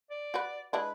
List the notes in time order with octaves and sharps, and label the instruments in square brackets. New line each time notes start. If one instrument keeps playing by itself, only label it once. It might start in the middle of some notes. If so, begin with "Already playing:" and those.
[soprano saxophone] D5
[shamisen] F#4 B4
[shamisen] G#3 D4 E4 [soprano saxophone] B4